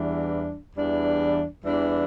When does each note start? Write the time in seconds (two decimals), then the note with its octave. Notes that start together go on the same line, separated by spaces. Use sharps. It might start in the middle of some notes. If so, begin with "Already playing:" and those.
Already playing: E2 E3 G3 D4
0.74 E2 E3 G3 D4
1.64 E2 E3 G3 D4